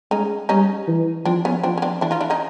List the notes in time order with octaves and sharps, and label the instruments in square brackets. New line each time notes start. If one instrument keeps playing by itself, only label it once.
[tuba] G#3 [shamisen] C#4 D#4
[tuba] G3 [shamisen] C#4 D#4
[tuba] E3
[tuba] F3 [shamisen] C4 D4
[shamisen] B3 C#4
[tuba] F3 [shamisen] C4 D4
[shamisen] C#4
C4 D4
[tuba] E3 [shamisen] D4 E4
[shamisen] D#4 F4
D4 E4
C#4 D#4